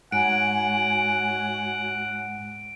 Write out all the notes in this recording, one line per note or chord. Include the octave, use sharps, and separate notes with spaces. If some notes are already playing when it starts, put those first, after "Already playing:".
G#2 F#4 C#5 F#5 G#5 D7